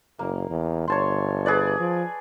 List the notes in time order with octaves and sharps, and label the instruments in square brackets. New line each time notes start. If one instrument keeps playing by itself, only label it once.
[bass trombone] F#1 [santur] A#3
[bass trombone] E2
[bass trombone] G1 [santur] C#5 A5 C6
[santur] G#4 B4 D5
[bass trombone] F3